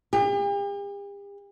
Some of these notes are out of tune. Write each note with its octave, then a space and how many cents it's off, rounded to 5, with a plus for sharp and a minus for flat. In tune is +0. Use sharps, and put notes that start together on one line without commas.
G4 +45